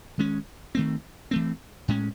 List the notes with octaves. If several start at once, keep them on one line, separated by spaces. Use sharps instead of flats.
D#3 G#3 C#4
D#3 A3 C4
E3 A3 C4
A2 G#3 C#4